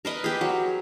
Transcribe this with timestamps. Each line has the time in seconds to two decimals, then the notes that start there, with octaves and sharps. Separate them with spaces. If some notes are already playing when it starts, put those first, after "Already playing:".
0.05 A#4 B4 D#5
0.24 G4 G#4
0.41 F#3